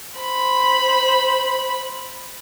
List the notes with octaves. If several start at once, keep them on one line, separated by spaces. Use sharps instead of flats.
C5 B5